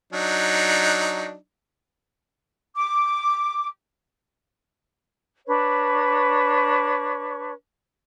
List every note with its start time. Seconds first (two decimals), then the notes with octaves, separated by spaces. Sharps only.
0.13 F#3 D4 D#4
2.75 D6
5.46 D4 B4 C#5 C#6